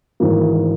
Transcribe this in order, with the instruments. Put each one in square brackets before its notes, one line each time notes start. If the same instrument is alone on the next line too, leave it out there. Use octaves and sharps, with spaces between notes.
[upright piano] G#1 G#2 E3 A#3